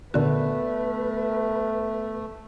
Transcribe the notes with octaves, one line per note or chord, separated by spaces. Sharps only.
A#2 D3 A3 B3 F#4 B4